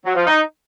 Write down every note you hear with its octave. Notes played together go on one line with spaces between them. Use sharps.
F#3
F3
D#4